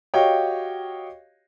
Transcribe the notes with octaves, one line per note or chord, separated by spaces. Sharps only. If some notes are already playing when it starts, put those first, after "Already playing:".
F#4 G4 C#5 D#5 F5 G5